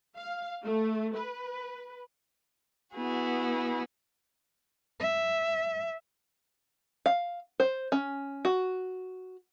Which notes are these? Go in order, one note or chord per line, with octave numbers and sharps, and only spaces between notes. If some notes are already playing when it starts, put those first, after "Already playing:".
F5
A3
B4
B3 E4 F#4 G#4
E5
F5
C5
C#4
F#4